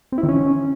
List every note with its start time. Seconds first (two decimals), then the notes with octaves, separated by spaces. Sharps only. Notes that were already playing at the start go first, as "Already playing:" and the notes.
0.12 C4
0.18 E4
0.23 D#3
0.29 C#4